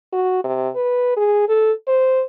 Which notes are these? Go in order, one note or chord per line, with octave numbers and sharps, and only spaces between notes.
F#4
C3
B4
G#4
A4
C5